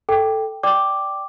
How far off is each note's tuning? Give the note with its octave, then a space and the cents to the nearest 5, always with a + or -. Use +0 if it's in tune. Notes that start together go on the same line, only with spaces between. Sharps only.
A4 +0 G5 +0
D5 +0 G5 -10 D6 +0